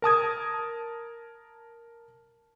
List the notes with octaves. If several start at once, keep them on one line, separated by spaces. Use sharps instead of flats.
A#4 A5 D#6 G#6